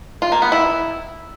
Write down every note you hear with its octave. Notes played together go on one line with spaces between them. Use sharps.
F4
A#3
B3
E4